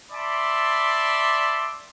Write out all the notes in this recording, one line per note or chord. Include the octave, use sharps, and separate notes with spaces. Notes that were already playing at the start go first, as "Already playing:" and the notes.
D5 E5 A5 B5 C6 D6